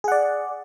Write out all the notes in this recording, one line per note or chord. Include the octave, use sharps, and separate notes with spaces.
G#4 D5 F#5